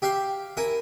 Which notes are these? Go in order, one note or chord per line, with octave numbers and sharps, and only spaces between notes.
G4 E5 F5 C6
E4 A#4 G#5